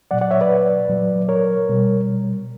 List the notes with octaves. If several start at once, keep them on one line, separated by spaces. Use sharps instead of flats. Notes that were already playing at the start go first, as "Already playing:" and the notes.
A#2 F#3 D5 F#5
D5 F#5
C#5 E5
B4 D5
A#2 F#3
A#4 C#5
B2 G3